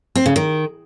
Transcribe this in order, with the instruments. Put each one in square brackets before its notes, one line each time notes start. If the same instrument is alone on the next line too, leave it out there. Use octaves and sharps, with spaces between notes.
[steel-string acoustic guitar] C4
C#3
D#3